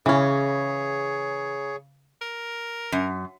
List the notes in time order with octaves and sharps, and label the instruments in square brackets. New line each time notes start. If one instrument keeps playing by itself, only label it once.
[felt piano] C#3 [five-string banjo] E3 C#4 [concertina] G#4 C#5
[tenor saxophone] A#4
[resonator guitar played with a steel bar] F#2